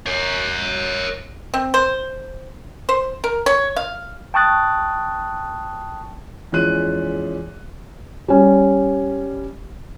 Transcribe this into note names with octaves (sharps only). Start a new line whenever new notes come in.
A#4 C#5
C4
C5
C5
A#4
C#5
F5
G5 A5 C#6 D#6 F#6 A6
E2 F3 G#3 C#4 F#6 D#7
G3 C#4